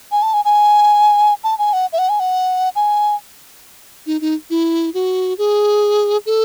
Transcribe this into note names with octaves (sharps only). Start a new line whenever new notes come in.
G#5
A5
G#5
G#5
A5
G#5
F#5
E5
F#5
G#5
F#5
G#5
D#4
D#4
E4
F#4
G#4
A4